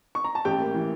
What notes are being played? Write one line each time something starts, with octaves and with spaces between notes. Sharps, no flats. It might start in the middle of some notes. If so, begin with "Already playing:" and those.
C#6
A#5
A5
A1 G4 G5
A#3
E3